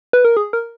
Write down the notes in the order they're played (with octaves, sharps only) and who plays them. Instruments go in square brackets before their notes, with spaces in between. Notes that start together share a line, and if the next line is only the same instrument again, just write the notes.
[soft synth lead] B4
A#4
G#4
A#4